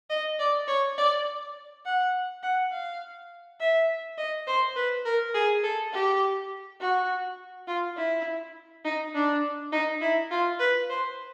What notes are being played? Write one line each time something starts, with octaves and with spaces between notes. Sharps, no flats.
D#5
D5
C#5
D5
F#5
F#5
F5
E5
D#5
C5
B4
A#4
G#4
A4
G4
F#4
F4
E4
D#4
D4
D#4
E4
F4
B4
C5